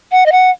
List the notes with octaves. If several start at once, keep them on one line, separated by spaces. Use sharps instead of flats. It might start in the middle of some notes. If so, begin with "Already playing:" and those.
F#5
D#5
F#5